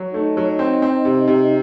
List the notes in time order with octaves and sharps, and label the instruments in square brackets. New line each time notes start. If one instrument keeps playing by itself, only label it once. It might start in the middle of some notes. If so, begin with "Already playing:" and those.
Already playing: [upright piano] F#3
[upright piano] A3 [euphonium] D#4
[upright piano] F#3
C4
C4
C3
C3